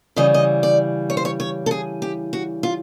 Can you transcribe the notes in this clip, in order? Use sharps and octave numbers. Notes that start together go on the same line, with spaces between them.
C#3 E3 G3 D#5
D#5
D5
C#5
C5
C#5
C#5
A4
G#4
G4
F#4
F4